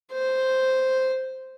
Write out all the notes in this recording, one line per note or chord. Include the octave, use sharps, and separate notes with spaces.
C5